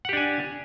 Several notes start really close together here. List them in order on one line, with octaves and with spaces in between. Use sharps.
F#5 G4 D4 G#5